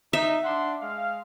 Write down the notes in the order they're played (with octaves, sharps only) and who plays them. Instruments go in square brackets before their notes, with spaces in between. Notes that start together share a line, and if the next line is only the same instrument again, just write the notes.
[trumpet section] D#4 [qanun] E5
[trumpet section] D4 F#5 C6
G#3 F5